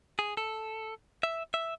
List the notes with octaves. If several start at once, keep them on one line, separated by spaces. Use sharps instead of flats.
G#4
A4
E5
E5